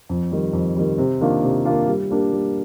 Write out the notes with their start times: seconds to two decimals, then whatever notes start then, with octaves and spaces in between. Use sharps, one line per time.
0.09 F2
0.31 D#3 G3
0.53 F2
0.77 D#3 G3
0.98 C3
1.21 D#3 A#3 D4 F4
1.43 C3
1.65 D#3 A#3 D4 F4
1.88 G3
2.10 A#3 D4 G4 A#4
2.33 G3